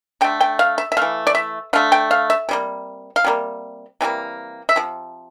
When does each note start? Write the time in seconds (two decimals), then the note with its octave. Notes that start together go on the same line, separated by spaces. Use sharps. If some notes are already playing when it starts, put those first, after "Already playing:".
0.21 D3 A3 G5
0.40 G5
0.59 F5
0.78 E5
0.92 E5
0.97 E3 A3 F5
1.27 D5
1.35 E5
1.73 D3 A3 F5
1.92 G5
2.11 F5
2.30 E5
2.49 C3 G3 A#3
3.16 F5
3.24 C3 G3 A#3
4.01 C3 E3 G3 A#3
4.69 E5
4.76 C3 F3